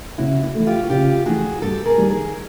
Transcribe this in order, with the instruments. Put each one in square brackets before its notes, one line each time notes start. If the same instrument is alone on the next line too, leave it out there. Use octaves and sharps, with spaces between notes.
[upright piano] C#3 [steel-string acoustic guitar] E4 F#4
[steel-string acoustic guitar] E4 F#4
[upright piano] E3 A3
[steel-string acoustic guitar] F4 G4
F#4
[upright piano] C#3 [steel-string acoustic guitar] F4 G4
[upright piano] E3 A3 [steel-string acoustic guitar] F#4 G#4
[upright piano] G2 [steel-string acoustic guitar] G4 A4
[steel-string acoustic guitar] G#4 A#4
[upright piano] D#3 G3
[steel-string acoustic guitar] G#4 A#4